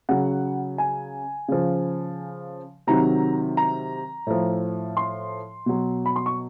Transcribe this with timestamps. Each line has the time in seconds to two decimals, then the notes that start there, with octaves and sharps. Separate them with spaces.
0.09 C#3 F#3 F#5
0.78 G#5
1.48 C#3 F3
2.87 C3 D#3 F#3 A#5
3.57 A#5
4.27 A2 F3
4.97 C6
5.66 B2 F#3
6.06 B5
6.16 C6
6.26 C#6